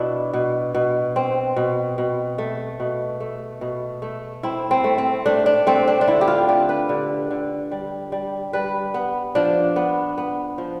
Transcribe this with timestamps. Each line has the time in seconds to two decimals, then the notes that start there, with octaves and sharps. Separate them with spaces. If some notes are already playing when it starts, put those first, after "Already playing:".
Already playing: B2 D4 E4
0.33 B2
0.75 B2
1.16 C4
1.56 B2
1.98 B2
2.38 A3
2.80 B2
3.20 A3
3.61 B2
4.02 A3
4.43 C4 E4
4.71 C4
4.84 A3
4.98 C4
5.26 A3 D4
5.46 D4
5.67 A3 C4
5.87 D4
6.01 D4
6.07 D3 E4
6.21 G4
6.28 F4
6.48 D3 G4
6.69 B4
6.89 D3
7.31 D3
7.71 G3
8.12 G3
8.53 G3 B4
8.94 B3
9.35 F3 D4
9.76 B3
10.18 B3
10.58 F3